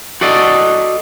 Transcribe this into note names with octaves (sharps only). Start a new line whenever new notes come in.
F#4 A4 D5 D#5